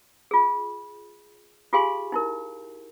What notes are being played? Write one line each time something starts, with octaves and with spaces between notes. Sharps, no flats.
F4 G#4
F4 G4 G#4 F5 G#5 C6
D#4 E4 A#4